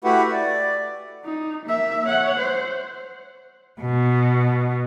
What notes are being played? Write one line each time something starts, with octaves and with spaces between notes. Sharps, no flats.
A3 E4 F#4 G4 B4 F#5
D5
D#4
A#3 E5
C#5 F#5
C5
B2